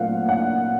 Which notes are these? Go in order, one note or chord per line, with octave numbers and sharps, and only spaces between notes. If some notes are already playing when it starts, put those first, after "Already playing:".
Already playing: A#2 F#3 A3 C4 F5 F#5
F#5